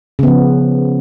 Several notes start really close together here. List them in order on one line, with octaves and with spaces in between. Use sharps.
C#3 B3 F3